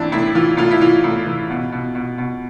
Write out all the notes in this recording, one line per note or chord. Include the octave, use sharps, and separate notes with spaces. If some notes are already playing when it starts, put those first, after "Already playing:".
Already playing: A2 E3 C4 D4
A2 E4
E3 F4
A2 F4
E4
E3 F4
A2
E3
B2
B2
B2
B2